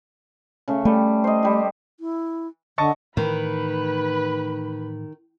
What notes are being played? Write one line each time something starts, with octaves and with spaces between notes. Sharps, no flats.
C#3 A3
G3 A3
C5 D#5
G3 G4
E4
D3 D#5 A5 C#6
A2 D#3 E3 A3 B4 B5